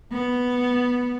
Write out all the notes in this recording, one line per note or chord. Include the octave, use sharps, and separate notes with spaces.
B3